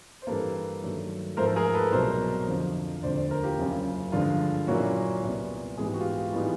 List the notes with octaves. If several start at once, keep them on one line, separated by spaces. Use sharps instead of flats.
C5
G2 E3 G3 A#3 A4 B4
G2 D#3 F#3 A3
G#2 F3 A3 A#4 C5
A4
G#4 A#4
A4 B4
C2 B2 F#3 A#4 C5
F2 D3 F3
E1 D2 D3 C5 D5
C5 D5
A#4 C5
F4 G4
F#1 F#2 C#3
G2 D3 F3 G#3 F4
A#2 F#3 A#3 C#4 E4 F#4
C2 A#2 G3 B3
G#2 E3 G#3 B3 G#4
G4
F#4
F4 G4
A2 E3 G3 B3 D#4